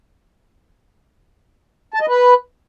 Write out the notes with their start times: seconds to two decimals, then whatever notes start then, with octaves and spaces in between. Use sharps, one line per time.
1.94 A5
2.01 D#5
2.08 B4